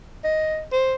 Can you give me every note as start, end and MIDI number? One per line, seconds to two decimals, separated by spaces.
0.24 0.63 75
0.72 0.95 72